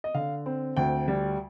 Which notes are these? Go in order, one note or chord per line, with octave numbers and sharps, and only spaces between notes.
D#5
D3 F5
C4
D2 G5
G3